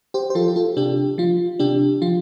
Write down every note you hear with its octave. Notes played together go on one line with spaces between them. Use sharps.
G4 C5
C5
F3 F4 A4
G4
F4 A4
C3 D4 G4
F3 F4
C3 D4 G4
F3 F4